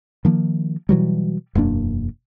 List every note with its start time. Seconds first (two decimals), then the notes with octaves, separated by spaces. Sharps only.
0.25 D#3 F3 A#3
0.89 B2 E3 F#3 G3
1.55 E1 F#2 A#3 D4